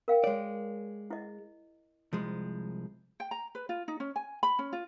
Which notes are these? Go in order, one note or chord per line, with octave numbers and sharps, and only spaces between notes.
A#4 F5 G5
G#3 C#5 D5
E4 D#5
C2 F3 G#3
G5
A#5
B4
F4
D#4
C#4
G#5
B5
C#4
F4